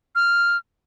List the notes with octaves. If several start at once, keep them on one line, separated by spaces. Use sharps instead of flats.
F6